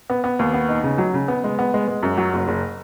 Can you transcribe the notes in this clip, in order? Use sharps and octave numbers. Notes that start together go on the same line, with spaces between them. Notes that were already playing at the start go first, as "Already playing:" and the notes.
B3
B3
D#2
B3
D#4
C#3
F#3
C#3
B3
G#3
B3
G#3
G#3
F#2
F#3
F#1
F#1